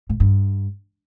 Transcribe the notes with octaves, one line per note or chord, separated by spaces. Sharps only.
A2
G2